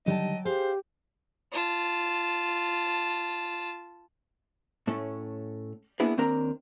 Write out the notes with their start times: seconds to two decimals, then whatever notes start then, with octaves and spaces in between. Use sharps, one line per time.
0.06 D3 D#3 F#3 G3 D#5 G5 A5
0.45 G4 G#4 C5 F5
1.52 F4 A5
4.87 A2 A3 C#4
6.00 A#3 B3 D4 E4 G#4 B4
6.17 D#2 C4 D4 A#4 A#5